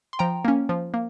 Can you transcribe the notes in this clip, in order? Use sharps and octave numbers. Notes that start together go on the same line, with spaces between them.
C6
F3 G5 A#5
A#3 C#4
F3
A#3